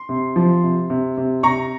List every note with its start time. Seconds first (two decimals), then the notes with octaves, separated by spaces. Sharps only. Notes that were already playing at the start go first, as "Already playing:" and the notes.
Already playing: C6
0.09 C3
0.36 F3
0.63 C3
0.90 C3
1.17 C3
1.43 C3 A#5 C#6